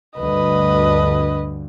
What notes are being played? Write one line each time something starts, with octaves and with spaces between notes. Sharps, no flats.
D2 G2 D3 B4 D#5